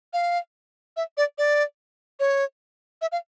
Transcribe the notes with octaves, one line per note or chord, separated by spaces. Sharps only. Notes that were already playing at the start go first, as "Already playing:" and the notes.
F5
E5
D5
D5
C#5
E5
F5